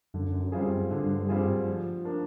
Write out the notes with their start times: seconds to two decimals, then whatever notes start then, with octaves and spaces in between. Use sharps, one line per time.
0.14 F#2 D3
0.52 G3 C4 F4 G#4
0.91 G2 D3
1.28 G3 C4 F4 G#4
1.67 F3
2.05 A#3 D4